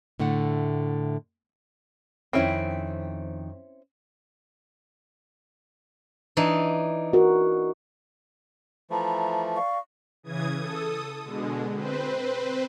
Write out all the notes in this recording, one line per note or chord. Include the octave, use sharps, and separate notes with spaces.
A2 D3 A3 F#5
F2 D#3 C4 C#4 E4 G5
E3 D4 D#4
F#4 A#4
E3 F3 A3 A#5 B5
D5 F5 C#6
C#3 E3 D#6 G#6
A4 D#6
B2 D3 G#3
C4 B4 C5